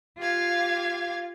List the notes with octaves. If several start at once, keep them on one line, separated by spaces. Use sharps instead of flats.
F4 G4 F5 G#6